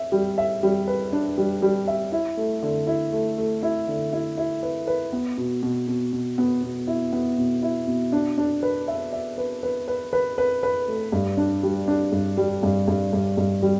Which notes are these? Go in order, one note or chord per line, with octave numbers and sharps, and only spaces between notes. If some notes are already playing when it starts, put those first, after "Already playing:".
Already playing: E5
G3
E5
G3
B4
D4
G3
G3
E5
E4
A3
D3
E4
A3
A3
E4
D3
E4
E4
B4
B4
B3
B2
B2
B2
B2
B3
B2
E4
B3
B2
E4
B2
D4
D4
B4
E5
E5
B4
B4
B4
B4
B4
B4
A3
G2
D4
G3
D4
G2
G3
G2
G2
G2
G2
G3